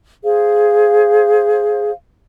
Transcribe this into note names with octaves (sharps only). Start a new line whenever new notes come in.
G#4 C5 F5